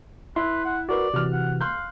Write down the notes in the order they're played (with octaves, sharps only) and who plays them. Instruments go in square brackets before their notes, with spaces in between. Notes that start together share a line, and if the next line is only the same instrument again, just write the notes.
[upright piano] E4 [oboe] B4 [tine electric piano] C6
[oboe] F#5
[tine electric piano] F#4 A#4 B4 [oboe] D5
[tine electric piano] C3 E3 [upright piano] F#4 F6
[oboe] F#5
[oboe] F5 [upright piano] C6 F#6 G6